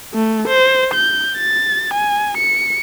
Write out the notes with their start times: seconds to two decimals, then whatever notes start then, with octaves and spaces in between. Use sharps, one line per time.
0.14 A3
0.48 C5
0.94 G6
1.37 A6
1.94 G#5
2.37 C#7